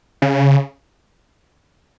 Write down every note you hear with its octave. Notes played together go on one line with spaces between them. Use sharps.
C#3